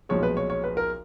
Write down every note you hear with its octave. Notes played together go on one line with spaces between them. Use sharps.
B1 A#2 F3 G#3 C#5
B4
C#5
C#5
B4
A#4